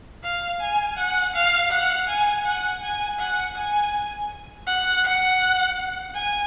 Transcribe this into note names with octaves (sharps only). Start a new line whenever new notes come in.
F5
G#5
F#5
F5
F#5
G#5
F#5
G#5
F#5
G#5
F#5
F#5
G#5